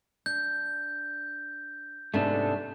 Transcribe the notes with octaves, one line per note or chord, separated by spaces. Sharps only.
D4 G6
G#2 C3 A3 B3 D4 A4